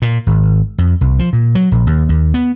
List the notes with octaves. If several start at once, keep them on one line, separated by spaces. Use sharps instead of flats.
A#2
G#1
F2
C2
F3
A#2
F#3
A#1
D#2
D#2
B3